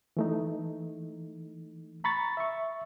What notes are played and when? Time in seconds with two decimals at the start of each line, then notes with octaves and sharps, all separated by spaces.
0.17 E3 A3 D#4
2.04 A#5 B5 C#6 A6
2.37 E5 C#6